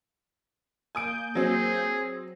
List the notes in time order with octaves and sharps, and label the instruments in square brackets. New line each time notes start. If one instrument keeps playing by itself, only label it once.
[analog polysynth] A#3 G6 [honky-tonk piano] G#5 D#6 D7
[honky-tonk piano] F#3 C4 [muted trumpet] G#4